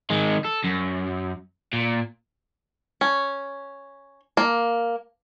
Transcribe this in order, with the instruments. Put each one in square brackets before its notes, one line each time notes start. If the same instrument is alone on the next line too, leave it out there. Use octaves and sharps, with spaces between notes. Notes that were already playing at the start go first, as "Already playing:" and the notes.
[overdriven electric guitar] D#3 G#3
A4
F#2
A#2
[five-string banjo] C#4
A#3